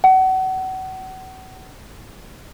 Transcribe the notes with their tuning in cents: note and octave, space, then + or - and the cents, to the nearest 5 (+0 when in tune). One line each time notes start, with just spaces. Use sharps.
F#5 +30